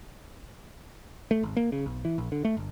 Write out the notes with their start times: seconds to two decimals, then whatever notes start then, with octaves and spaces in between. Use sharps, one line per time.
1.31 A3
1.43 G#1
1.57 A#3
1.72 C#3
1.86 B1
2.05 E3
2.18 A#1
2.32 D3
2.45 A3
2.57 G1